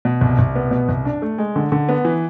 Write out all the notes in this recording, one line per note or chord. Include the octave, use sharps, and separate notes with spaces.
B2
C2
C2
B3
B2
C2
D4
A3
G#3
D3
D3
B3
E3